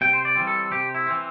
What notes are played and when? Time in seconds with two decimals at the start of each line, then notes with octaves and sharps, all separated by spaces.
0.01 C3 G5
0.13 C5
0.25 D5
0.35 E3 G3 C4
0.47 A4
0.72 C3 G4
0.95 E4
1.07 E3 C4